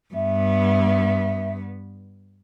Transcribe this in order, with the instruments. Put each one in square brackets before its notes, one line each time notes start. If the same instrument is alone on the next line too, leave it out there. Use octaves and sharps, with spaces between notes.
[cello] G2 B3 [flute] E5